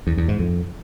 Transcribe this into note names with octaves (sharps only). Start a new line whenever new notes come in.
E2
E2
G#2
F2